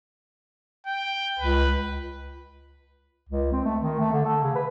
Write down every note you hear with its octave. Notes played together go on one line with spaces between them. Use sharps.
G5
C#2 B4
C#2
C4
A3
D#3
A3
D3
A4
C#3
B4